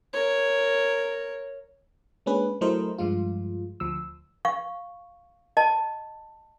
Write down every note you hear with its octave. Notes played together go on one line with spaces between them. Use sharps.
A#4 C#5
G#3 A#3 C#4 D4 G#4 B4
F#3 A3 E4 A#4 C5 D#5
G2 F3 G#3 F4
D2 F3 E6
F5 C#6
D#5 A5